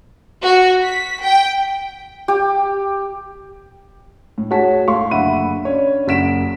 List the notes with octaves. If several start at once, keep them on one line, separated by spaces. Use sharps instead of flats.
F#4
B6
G5
G4
A2
F#4 G#4 C#5 A5 B6
A2 A3 F5 C6 C#6
F#1 D3 E5 F#5 B5 D#7
C#4 D4 C#5
F#1 F#2 F#5 B6 D7 E7